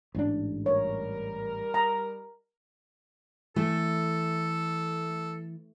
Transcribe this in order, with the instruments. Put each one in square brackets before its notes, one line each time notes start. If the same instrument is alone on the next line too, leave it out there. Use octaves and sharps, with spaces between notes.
[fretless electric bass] A1 G#2 D4
[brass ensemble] G3 A#4 [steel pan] C#5
[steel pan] A#5
[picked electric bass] E3 [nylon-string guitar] A3 [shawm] A4